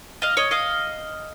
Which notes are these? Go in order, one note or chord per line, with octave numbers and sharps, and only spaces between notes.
D#5 F5
C#5 D#5
D#5 F5